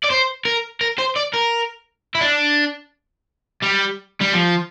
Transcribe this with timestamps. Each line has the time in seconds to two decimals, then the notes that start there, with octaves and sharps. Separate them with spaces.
0.04 D5
0.10 C5
0.45 A#4
0.81 A#4
0.98 C5
1.16 D5
1.33 A#4
2.15 E4
2.21 D4
3.63 G3
4.21 G3
4.33 F3